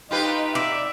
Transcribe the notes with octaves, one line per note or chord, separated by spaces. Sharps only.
D#4 F4 G4 B4
D5 E5